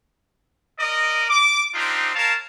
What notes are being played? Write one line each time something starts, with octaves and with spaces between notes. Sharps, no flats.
A#4 D5 D#5
D6
C4 D4 D#4 F4 G4
A#4 C#5 F5 A5